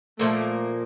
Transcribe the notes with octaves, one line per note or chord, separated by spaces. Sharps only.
A#2 F3 A3 A#3